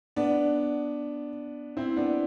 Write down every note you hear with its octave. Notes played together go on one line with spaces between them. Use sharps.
B3 D4
C4 E4
B3 D4